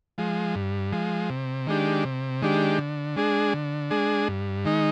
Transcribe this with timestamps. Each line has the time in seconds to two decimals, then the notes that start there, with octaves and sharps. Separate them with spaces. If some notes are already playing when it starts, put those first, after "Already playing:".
0.18 F3 G#3
0.55 G2
0.92 F3 G#3
1.30 C3
1.67 D#3 G#3 D4 G4
2.05 C3
2.42 D#3 G#3 D4 G4
2.79 D3
3.16 G#3 D4 G#4
3.53 D3
3.91 G#3 D4 G#4
4.28 G2
4.65 D#3 G#3 D#4